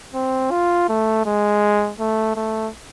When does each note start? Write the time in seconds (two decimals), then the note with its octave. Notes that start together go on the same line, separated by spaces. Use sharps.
0.14 C4
0.51 F4
0.89 A3
1.26 G#3
1.99 A3
2.36 A3